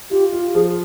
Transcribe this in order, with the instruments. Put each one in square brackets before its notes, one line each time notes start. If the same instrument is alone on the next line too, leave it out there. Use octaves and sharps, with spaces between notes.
[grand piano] F4 [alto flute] G4
[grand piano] F4
[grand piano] F3 [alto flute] G#4